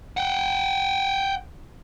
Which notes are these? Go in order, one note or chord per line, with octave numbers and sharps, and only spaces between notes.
F#5 G5